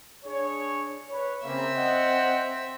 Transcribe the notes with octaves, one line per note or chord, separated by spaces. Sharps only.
D4 G#4 C#5
B4 C#5
C#3 A#3 C4 E5
D#5 F#5